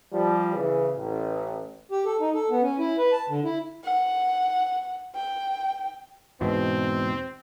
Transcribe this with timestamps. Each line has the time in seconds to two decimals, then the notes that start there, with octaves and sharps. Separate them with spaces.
0.12 F3 G3
0.53 C#3 E3
0.94 A1
1.92 G4
2.06 A4
2.20 D#4
2.34 A4
2.50 B3
2.62 C#4
2.79 E4
2.98 B4
3.12 A5
3.29 D3
3.45 E4
3.84 F#5
5.15 G5
6.41 E2 G#2 B2 C4